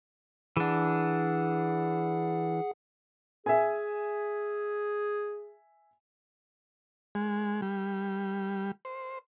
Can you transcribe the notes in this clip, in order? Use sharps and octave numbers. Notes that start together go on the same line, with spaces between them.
E3 D4 G#4 F#5
G#4 E5 G#5
G#3
G3
C5